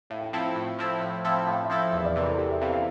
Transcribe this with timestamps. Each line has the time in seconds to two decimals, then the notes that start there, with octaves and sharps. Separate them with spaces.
0.10 A2 F5
0.21 G5
0.33 F3 C4 E4 A4 F5
0.56 A2
0.79 F3 C4 E4 A4
1.01 A2
1.25 F3 C4 E4 A4
1.47 A2 F5
1.63 E5
1.70 F3 C4 E4 A4
1.93 E2 E5
2.04 D5
2.16 C3 E3 A#4
2.28 A4
2.38 E2 G4
2.50 E5
2.61 C3 E3 F5
2.73 F5